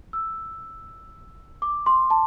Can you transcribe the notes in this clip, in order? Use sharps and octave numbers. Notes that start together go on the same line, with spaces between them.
E6
D6
C6
A5